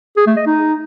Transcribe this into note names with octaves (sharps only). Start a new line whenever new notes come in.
G#4
A3
D#5
D#4